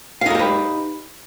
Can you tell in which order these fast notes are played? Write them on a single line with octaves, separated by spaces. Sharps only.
F5 D#4 A#4 G4 B4